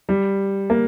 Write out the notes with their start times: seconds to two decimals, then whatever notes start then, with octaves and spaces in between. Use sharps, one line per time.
0.09 G3
0.70 A#3